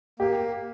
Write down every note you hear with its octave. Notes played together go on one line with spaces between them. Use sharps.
A#3 G4